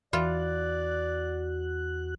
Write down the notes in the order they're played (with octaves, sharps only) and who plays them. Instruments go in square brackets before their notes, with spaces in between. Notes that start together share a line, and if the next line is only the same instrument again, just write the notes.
[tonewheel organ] E2 F#4 F#6 [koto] E3 F4 [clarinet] D5